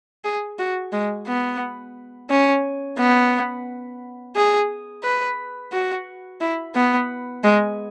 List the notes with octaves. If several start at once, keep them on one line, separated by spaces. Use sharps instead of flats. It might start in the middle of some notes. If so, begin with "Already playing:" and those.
G#4
F#4
G#3
B3
C#4
B3
G#4
B4
F#4
E4
B3
G#3